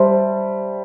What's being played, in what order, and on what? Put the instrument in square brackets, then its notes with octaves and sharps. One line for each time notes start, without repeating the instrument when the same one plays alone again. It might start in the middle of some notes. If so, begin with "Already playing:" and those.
Already playing: [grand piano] G3 [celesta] C5 E5 A5 C6